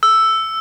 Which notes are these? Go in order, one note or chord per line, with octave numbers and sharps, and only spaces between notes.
E6